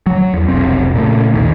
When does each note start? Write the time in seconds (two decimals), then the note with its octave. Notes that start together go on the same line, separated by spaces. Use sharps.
0.07 F#3
0.34 E2
0.48 F1 B1 C4
0.94 A#2 C#3 A3
1.33 B1 E2 D#3